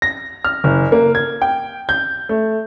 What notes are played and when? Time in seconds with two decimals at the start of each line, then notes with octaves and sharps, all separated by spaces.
0.02 A#6
0.44 F6
0.64 F#1
0.92 A#3
1.15 G#6
1.42 G5
1.89 G6
2.29 A3